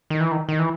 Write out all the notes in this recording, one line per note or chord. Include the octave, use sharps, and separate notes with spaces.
D#3
E3
D#3
D#3
E3